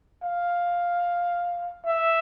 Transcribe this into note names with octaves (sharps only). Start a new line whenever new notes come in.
F5
E5